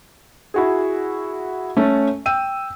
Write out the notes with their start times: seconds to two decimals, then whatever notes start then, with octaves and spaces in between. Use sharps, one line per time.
0.54 E4 F#4 G#4
1.77 A3 C#4 A4
2.26 G5 E6 D#7